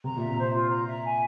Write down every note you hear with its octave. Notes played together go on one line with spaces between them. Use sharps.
C3 A#5
A#2 E5
C3
C5
F4
A#5
E5
G#5